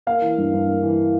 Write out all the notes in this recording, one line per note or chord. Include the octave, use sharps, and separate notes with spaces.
A#3 F5
E3
G2
G2
A#3
E3